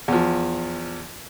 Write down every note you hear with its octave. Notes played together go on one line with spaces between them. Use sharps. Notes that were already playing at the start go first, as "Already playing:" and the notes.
E2 F3